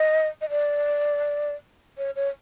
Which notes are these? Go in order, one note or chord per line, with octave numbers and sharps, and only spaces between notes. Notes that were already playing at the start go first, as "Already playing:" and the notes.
Already playing: D#5
D#5
D5
C#5
C#5